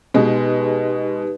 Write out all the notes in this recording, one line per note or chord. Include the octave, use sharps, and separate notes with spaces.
B2 G#3 B3 D#4 G4 B4